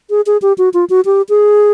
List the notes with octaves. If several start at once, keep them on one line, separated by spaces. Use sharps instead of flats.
G#4
G#4
G4
F#4
F4
F#4
G4
G#4